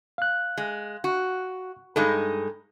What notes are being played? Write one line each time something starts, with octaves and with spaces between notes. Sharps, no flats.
F5 F#6
G#3
F#4
G2 G#3 D#4 A4